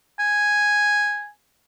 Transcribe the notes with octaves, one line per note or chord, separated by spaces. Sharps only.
G#5